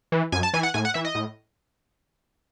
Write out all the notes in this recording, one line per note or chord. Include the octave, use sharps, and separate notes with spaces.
E3
F#2 G#5
A5
E3 G#5
F#5
A2 G#5
F#5
E3 E5
D#5
A2